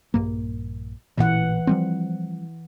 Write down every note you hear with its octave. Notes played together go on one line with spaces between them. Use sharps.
A#1 G2 A#3
A1 A#2 E3 F#5
F3 G3 C4